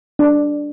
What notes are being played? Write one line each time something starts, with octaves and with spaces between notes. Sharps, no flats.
D4